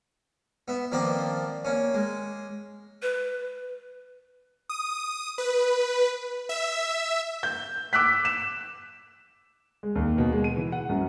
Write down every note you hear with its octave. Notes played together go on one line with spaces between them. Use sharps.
B3 E5
D#3 F3 A#3 C4 D5
A#3 C#4
G#3
B4
D#6
B4
E5
G6
D6 E6 F#6 B6
E7
G#3
D#2
B2
G#3
D#7
E3
F#5
F#2